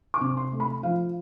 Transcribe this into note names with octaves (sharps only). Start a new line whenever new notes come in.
D6
C3
C6
A3
B5
F3 F5